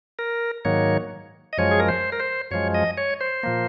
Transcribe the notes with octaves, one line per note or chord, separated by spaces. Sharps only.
A#4
G#2 D#3 F#3 A#3 C#5
D#5
F#2 F3 G#3 C#5
G#4
A#4
C5
A#4
C5
F#2 F3 G#3 C#5
D#5
C#5
C5
A#2 F3 A#3